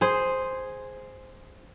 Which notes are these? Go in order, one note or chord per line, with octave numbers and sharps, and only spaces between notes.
G#4 C5